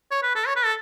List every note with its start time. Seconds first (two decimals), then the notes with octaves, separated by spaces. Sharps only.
0.11 C#5
0.23 B4
0.35 A4
0.47 C#5
0.56 B4
0.65 A4